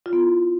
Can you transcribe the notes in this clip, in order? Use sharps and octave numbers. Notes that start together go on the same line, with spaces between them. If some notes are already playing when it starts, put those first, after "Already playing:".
F4
B3
E4